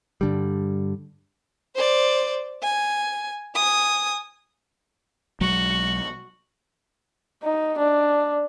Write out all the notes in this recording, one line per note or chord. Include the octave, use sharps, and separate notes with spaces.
G2 D3 G3
C5 D5
G#5
G#5 D#6
B1 F#3 G#3 F#4
D#4
D4